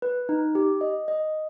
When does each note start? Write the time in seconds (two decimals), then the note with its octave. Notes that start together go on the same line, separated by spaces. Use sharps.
0.02 B4
0.29 D#4
0.55 G4
0.81 D#5
1.08 D#5